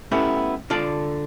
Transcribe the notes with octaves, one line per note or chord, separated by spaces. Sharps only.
A3 B3 C#4 E4 G4 A4
D3 F4 A4 D5